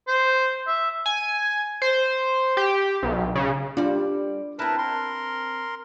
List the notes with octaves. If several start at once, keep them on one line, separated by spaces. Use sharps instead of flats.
C5
E5
G#5
C5
G4
B1
C#3
G3 D4 F4 D5
C4 E4 A#4 B4 A5
A#4 C6